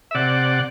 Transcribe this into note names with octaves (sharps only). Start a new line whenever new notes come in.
E5
C3 D5 F#5